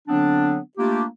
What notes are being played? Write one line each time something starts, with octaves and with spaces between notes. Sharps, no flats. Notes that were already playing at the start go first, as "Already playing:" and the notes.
D3 F#3 B3 C4 D4
A3 A#3 D4 F4 G4